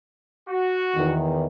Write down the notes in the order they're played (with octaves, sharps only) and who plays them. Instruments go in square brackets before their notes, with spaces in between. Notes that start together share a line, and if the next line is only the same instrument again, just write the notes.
[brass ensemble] F#4
[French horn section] E2 D#3